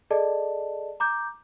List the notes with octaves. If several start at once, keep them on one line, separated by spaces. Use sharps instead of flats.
G#4 A4 D5 D#5 A5
A#5 D6 G6